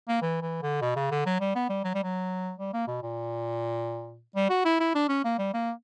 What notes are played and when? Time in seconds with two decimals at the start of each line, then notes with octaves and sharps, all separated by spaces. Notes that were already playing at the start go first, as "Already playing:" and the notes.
0.08 A#3
0.22 E3
0.42 E3
0.62 D3
0.81 B2
0.96 C#3
1.11 D3
1.26 F#3
1.40 G3
1.55 B3
1.69 G3
1.84 F#3
1.94 G3
2.03 F#3
2.59 G3
2.73 A#3
2.87 B2
3.02 A#2
4.36 G3
4.50 F#4
4.65 E4
4.80 E4
4.95 D4
5.09 C#4
5.24 A#3
5.38 G3
5.54 A#3